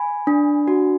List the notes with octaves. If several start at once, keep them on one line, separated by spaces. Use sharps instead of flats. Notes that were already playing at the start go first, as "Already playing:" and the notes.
Already playing: G#5 B5
D4
F#4